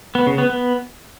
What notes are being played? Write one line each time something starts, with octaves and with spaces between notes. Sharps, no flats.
B3
C#3
B3
B3